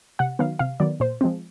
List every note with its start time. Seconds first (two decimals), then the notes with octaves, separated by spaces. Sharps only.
0.19 C3 F#5
0.39 D#3 F#3 B3 F5
0.59 C3 F5
0.80 D#3 F#3 B3 D5
1.00 A#2 C5
1.21 F3 G#3 C4